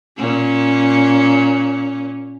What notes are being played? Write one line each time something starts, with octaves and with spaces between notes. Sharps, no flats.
A#2 C#4